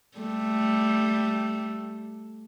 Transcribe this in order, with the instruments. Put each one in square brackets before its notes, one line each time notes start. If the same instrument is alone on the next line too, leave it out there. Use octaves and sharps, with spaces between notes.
[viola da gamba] G3 A3